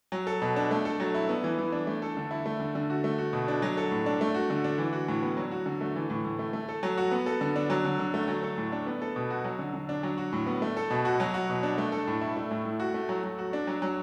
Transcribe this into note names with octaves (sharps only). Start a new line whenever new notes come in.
F#3
A4
B2
D4
A3
A4
F#3
E4
B3
E3
E3
D4
A3
A4
D3
E4
A3
D3
D3
F#4
A3
F#4
B2
D4
F#3
A4
A2
D4
A3
F#4
D3
D4
E3
F#4
A2
B3
F#3
F#4
D3
A3
E3
A2
A2
A3
A3
A4
F#3
F#4
B3
A4
D3
D4
F#3
D3
D3
A3
F#3
A4
A2
D4
B3
A4
B2
F#4
F#3
D3
D3
D4
F#3
F#4
A2
B3
A3
A4
B2
F#4
F#3
F#4
B2
D4
A3
A4
A2
E4
A3
A2
A2
F#4
A3
F#3
F#3
F#4
D4
F#3
F#3